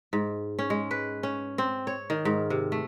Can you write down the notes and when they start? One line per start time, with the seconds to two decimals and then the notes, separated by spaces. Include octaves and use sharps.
0.13 G#2
0.59 C#4
0.70 G#3
0.91 B4
1.23 C#4
1.58 C4
1.87 C#5
2.10 D#3
2.25 G#2
2.50 C3
2.72 A3